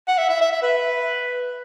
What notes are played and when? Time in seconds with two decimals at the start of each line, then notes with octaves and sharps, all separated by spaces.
0.08 F#5
0.18 E5
0.29 E5
0.41 E5
0.52 E5
0.62 B4